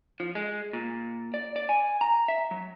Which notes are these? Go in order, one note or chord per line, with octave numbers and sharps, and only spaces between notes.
F3
G#3
A#2
D5
D5
G#5
A#5
E5
F#3